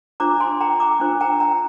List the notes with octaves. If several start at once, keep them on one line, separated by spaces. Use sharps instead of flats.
D4 F4 C5 A#5 D6
G#5 C6
G5 A#5
A#5 D6
D4 F4 C5
G5 A#5
G5 A#5